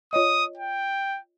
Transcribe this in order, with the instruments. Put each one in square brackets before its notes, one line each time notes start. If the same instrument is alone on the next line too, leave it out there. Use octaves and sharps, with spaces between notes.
[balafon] F4 C#5 D#5 [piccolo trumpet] D#6
[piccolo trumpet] G5